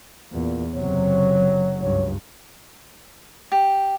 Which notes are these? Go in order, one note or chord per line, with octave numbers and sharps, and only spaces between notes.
E2 A#2
F#1 C3 F#3 C#5
C#2 G2 C#5
G4